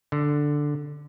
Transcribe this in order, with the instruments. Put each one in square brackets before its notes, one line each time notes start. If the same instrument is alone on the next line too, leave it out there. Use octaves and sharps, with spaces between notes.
[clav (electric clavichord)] D3